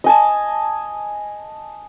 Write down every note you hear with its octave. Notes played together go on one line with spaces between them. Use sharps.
D#5 G#5 A5